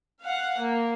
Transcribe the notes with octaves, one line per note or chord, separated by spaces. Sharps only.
F5 F#5
A#3